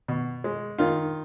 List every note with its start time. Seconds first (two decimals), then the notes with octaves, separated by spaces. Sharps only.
0.08 B2
0.44 G#3
0.78 D#3 F4